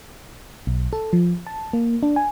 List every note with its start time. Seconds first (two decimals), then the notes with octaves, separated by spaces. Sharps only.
0.67 B1
0.93 A4
1.13 F3
1.47 A5
1.73 A#3
2.03 D4
2.16 G#5